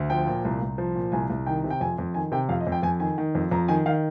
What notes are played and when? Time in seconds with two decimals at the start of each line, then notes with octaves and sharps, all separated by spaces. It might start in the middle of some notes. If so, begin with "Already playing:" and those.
Already playing: D2
0.10 F3 G5
0.27 A#2
0.45 C2
0.61 C2
0.78 F3
0.95 A#2
1.12 C2 G#5
1.30 C2
1.46 D#3 G5
1.64 C3
1.70 G5
1.81 F2 G#5
1.98 F2
2.14 D#3 G#5
2.32 C3 G5
2.49 F2 F5
2.60 D#5
2.67 F2
2.72 G5
2.83 F2 G#5
3.00 D#3 G#5
3.18 D#3
3.35 F2
3.51 F2 A#5
3.68 D#3 G#5
3.86 D#3 F5